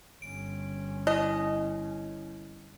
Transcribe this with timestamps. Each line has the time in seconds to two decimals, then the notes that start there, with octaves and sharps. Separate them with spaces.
0.22 G1 C#4 D7
1.07 E4 D#5